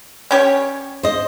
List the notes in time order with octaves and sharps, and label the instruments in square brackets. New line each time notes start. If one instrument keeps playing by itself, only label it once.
[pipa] C#4 G4 C#5
[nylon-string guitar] C5 D#5